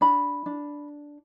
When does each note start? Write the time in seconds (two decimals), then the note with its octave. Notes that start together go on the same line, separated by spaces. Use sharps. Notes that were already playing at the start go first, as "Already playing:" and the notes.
0.01 D4 B5
0.46 D4